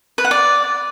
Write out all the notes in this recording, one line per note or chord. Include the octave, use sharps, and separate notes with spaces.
B4
F#5
D5